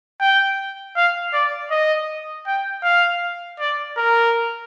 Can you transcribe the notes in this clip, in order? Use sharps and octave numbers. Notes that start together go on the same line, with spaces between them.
G5
F5
D5
D#5
G5
F5
D5
A#4